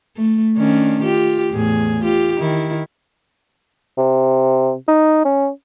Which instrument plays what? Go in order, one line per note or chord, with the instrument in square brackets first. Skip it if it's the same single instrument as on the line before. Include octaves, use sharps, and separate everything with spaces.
[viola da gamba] A3
D#3 C#4 D4
F4 G4
E2 A2 G#4
F4 G4
D#3 E4
[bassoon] C3
D#4
C#4